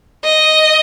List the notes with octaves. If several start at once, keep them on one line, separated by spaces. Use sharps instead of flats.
D#5